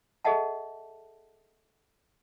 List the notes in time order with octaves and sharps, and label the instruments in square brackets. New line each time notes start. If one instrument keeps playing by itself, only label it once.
[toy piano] G#4 A4 D#5 E5 F#5 A5